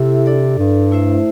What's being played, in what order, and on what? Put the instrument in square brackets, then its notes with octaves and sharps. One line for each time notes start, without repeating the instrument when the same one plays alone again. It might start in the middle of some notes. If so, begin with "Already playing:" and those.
Already playing: [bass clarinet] C3 [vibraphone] E4 A4 E5
[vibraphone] D4 A4 D5
[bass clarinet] G2
[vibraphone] A3 E4 C5 E5